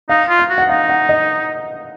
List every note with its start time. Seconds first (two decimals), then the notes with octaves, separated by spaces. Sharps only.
0.09 D#4 F5
0.29 F4
0.39 F5
0.50 F#4
0.58 F#5
0.69 D#4 F5
0.89 F#5
1.09 D#5